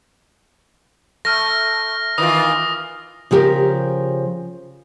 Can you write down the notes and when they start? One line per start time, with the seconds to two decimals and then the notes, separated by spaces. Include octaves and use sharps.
1.25 A3 F6 A#6
2.18 D#3 E3 F4 D#6
3.31 C#3 F3 G4 A#4